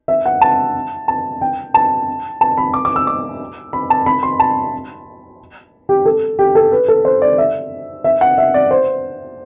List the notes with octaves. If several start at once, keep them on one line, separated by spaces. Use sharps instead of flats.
E5
F#5
A5
A5
G5
A5
A5
B5
D6
D6
E6
D6
B5
A5
B5
C6
A5
G4
A4
G4
A4
B4
A4
C5
D5
E5
E5
F#5
E5
D5
C5